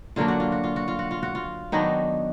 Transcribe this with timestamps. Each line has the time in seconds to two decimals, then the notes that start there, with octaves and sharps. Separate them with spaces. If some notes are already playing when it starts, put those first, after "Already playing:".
0.16 D3 F#3 A#3 D4 F4
0.28 F#4
0.40 F4
0.52 F#4
0.64 F4
0.76 F#4
0.88 F4
0.99 F#4
1.11 F4
1.23 F#4
1.35 F4
1.72 D#3 F#3 B3 D4 D#4